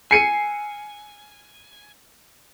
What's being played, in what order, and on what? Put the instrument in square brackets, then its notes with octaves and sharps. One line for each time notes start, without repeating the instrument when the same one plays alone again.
[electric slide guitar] G#5 [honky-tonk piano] C7 C#7 D#7